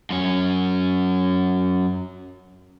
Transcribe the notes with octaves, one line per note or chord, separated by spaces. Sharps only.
F#2 C#4